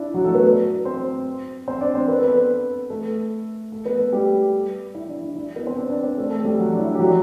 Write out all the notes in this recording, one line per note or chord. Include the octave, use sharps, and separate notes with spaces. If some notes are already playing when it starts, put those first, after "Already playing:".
Already playing: D4 E4
F#3 F#4
A3 A4
B3 B4
C4 C5
C4 C5
D4 D5
C4 C5
B4
A4
B3 B4
A3 A4
A3 A4
B3 B4
A3 A4
G3 G4
E4
D4
D4
E4
B3 B4
C4 C5
D4 D5
D4 D5
C4 C5
A3 A4
A3 A4
G3 G4
F#3 F#4
D4
E4
G4
F#3 F#4